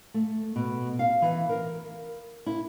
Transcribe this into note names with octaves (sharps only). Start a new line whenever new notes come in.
A3
B2
F5
E3
A#4
E4